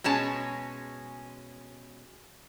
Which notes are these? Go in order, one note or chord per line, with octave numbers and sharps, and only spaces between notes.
B2 G#3 C#4 A5